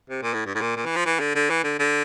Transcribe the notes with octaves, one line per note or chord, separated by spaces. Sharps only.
C3
A#2
A2
G2
A2
A#2
A#2
E3
F3
E3
D3
D3
E3
D3
D3